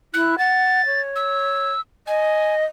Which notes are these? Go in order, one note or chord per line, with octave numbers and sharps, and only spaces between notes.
E4 F#6
F#5 A6
C#5
E6
D#5 G#5